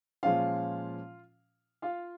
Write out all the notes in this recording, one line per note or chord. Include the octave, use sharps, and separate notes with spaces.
A#2 F3 G#3 C#4 F4 F5
F4 F5